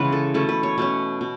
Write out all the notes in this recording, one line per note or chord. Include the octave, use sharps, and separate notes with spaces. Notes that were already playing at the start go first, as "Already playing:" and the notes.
Already playing: C#3 E3 G#3 B3 B4
A4
B2 A3 C#4 A4
B4
C#5
B2 A3 C#4
B2